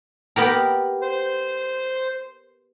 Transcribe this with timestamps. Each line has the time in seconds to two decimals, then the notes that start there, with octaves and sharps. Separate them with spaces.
0.36 B3 G4 A#4
1.02 C5